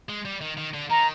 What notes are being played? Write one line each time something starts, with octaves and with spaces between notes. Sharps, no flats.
G#3
G3
D#3
D#3
D3
D#3 A#5